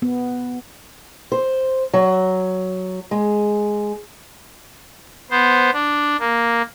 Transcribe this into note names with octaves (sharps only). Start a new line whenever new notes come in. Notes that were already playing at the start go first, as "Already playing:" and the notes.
B3
C5
F#3
G#3
B3 C5
D4
A#3